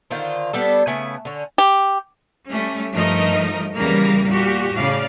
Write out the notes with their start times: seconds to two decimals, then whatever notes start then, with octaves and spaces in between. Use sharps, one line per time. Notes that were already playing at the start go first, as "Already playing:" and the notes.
0.11 D3 D#3 F4 C5
0.53 G3 B3 D4 A4
0.87 C#3 A3 B3 G#5
1.25 D3 C#4
1.58 G4
2.49 G3 A3 C#4
2.92 G2 F3 A3 D#4 A#4 D#5
3.75 E2 C#3 G3 A#3 A#4
4.27 A#2 F#4 G4
4.73 A2 C#3 D5 F5